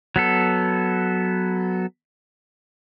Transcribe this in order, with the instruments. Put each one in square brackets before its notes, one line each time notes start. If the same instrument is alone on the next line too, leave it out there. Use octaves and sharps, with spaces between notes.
[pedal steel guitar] F#3 B3 A4